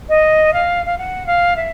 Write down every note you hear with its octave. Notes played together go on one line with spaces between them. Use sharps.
D#5
F5
F5
F#5
F5
E5